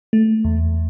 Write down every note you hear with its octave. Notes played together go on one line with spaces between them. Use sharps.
A3
E2